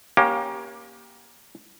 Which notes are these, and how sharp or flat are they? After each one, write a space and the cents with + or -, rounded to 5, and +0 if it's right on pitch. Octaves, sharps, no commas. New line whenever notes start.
A#3 +20 C#4 +0 G4 +0